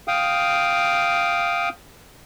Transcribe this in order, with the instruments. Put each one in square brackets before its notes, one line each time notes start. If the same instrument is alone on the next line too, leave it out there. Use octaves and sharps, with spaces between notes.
[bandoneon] F5 G5 D#6